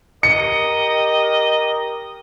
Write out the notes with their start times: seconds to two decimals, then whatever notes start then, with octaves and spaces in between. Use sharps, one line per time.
0.23 G4 A#4 D#5 C#7